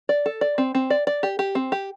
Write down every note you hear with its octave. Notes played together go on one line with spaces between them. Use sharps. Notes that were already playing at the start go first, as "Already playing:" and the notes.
D5
A4
D5
C4
C4
D5
D5
G4
G4
C4
G4